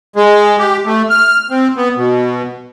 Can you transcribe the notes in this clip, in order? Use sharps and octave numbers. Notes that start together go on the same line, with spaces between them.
G#3
G4
A3
F6
C4
B3
B2